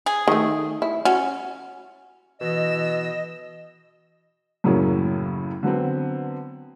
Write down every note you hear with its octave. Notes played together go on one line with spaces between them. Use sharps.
G#4
D#3 A3
E4
C#4 F#4
B2 E3 D#5 E6
F#2 A2 C#3 F#3 A#3 C#4
D3 F#3 B3 C4